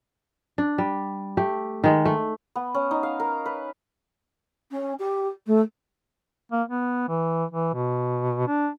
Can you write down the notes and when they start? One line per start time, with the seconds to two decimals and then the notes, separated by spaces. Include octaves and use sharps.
0.58 D4
0.78 G3
1.37 A3 G4
1.84 D#3 G#3
2.05 A3
2.56 B3
2.74 C#4
2.91 D#4
3.03 F5
3.20 A#4
3.46 B4
4.71 C#4
4.99 G4
5.47 A3
6.52 A#3
6.68 B3
7.09 E3
7.51 E3
7.74 B2
8.48 D4